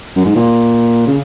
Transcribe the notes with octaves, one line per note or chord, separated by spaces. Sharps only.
F#2
G#2
A#2
C#3